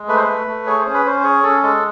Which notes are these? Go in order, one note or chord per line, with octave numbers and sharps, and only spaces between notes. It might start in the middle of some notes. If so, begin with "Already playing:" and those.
Already playing: G#3
A3 B4
C5
A3 B4
A3
G#4 C#5
C5
C#4
B4
C#4 C5
C5
G#4 C#5
C#4 A4
G#3 A4